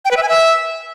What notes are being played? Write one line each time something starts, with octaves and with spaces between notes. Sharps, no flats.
G5
B4
E5
G#5
E5